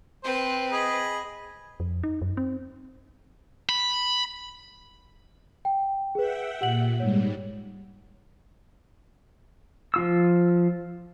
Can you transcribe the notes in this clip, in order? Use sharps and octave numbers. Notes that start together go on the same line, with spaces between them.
C4 B4 C5
G#4 D#5 B5
F2
D#4
F#2
C4
B5
G5
G#4 B4 E5 F#5 G5
A#2 G4 F#5 F#7
G#2 G3 C#5
F3 F4 E6